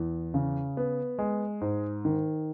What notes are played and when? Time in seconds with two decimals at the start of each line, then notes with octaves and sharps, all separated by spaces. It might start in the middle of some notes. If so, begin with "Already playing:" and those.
Already playing: E2
0.34 C#3
0.77 B3
1.19 G#3
1.61 G#2
2.05 D#3